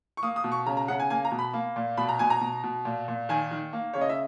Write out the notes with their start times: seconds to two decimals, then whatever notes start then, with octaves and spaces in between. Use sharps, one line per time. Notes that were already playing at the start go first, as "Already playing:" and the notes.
0.17 C#6
0.23 A#3 D#6
0.36 D#6
0.44 B2
0.52 C#6
0.66 C#3 A#5
0.77 A#5
0.88 C#3 F#5
1.00 G#5
1.10 A#3 G#5
1.25 A#5
1.31 B2
1.39 B5
1.53 A#3
1.76 A#2
1.97 B2 B5
2.09 A#5
2.19 B2 G#5
2.30 A#5
2.41 B2
2.63 B2
2.85 A#2
3.08 A#2
3.29 D#3 G#5
3.51 D#3
3.73 A#3
3.93 C#3 C#5
4.01 D#5
4.09 E5